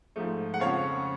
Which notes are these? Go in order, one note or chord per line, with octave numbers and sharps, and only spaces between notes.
G#2 F3 A3
F#5
F2 C#3 F3 C#5 F5